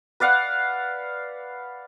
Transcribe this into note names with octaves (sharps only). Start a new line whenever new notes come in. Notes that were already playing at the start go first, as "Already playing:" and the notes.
B4 D5 F5 F#5